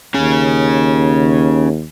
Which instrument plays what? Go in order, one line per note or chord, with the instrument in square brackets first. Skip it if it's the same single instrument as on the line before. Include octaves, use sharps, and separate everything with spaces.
[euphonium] D#2 [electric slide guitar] C#4 G#4